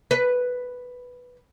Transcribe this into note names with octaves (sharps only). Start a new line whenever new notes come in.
B4